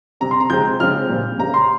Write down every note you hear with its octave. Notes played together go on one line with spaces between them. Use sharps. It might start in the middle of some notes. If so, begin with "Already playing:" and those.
C3 G3 C4 A#5
C6
A#5
C3 F3 G#3 C4 G6
C#3 F3 G#3 C4 F6
A#2 G3 C4
C#3 G3 A#3 A#5
C6